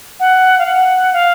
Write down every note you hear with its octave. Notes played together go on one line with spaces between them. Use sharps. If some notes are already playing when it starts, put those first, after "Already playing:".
F#5
F5
F#5
F5